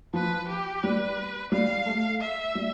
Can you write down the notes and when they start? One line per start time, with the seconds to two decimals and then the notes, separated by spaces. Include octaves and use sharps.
0.14 F3 B4
0.48 G4
0.83 G3 B4
1.52 G3 F5
1.86 A3
2.21 E5
2.55 G3